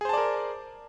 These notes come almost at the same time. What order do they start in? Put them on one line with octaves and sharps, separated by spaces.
G#4 C5 A5 D5 A#4